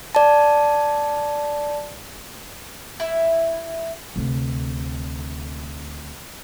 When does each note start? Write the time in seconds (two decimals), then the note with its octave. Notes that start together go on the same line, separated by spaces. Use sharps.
0.15 D5 A5
3.00 E4
4.16 D2 C3